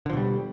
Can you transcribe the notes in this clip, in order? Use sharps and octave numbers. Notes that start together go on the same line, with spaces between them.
B2 D3 F3 G3